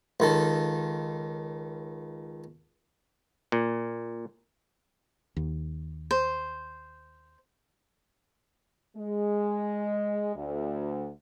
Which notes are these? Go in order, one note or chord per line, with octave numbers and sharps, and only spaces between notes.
C#2 D#3 A4
A#2
D#2
C5
G#3
D2